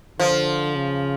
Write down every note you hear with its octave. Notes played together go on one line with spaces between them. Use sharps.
D3 F3
C#3